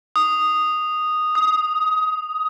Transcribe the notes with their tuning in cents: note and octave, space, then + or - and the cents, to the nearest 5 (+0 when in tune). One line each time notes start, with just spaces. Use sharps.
D#6 -5
D#6 +20